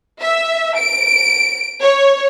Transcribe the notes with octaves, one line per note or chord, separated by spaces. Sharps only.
E5
D7
C#5